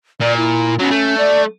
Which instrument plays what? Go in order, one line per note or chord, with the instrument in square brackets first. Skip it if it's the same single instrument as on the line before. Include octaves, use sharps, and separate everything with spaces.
[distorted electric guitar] A#2 [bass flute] D5
[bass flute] E4
[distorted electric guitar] F#3 B3 [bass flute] C#4
[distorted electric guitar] A3
[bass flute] D5